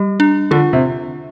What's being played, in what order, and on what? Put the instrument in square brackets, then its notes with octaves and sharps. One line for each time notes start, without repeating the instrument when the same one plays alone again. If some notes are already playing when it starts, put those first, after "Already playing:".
Already playing: [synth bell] G3 G4
D4
[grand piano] D3 [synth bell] F4
[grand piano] C3